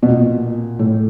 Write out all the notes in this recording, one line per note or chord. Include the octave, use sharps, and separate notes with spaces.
B2
A#2
A2